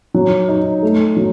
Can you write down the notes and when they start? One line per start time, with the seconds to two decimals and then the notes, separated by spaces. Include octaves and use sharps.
0.14 F#3
0.48 D#4
0.82 A3
1.17 F#3